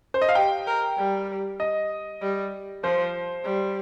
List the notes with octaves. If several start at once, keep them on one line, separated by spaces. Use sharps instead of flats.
C5
D#5
F5
G4 G5
A#4
G3
D#5
G3
F3 C5
G3